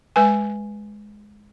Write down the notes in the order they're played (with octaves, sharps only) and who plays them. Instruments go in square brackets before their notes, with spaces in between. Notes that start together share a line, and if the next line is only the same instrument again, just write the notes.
[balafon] G#3 B4 G#5